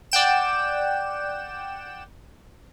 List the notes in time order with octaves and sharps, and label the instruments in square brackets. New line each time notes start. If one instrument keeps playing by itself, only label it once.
[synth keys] D5 F#5 G5 E7